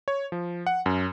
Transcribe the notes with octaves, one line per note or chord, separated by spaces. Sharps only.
C#5
F3
F#5
F#2